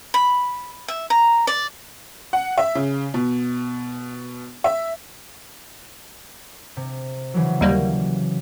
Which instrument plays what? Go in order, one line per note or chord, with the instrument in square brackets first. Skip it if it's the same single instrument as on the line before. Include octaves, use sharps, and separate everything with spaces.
[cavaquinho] B5
E5
A#5
D5
[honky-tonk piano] F#5
E5
C#3
B2
E5
[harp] C3
C#3 E3 F#3
[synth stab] D#2 G3 A#3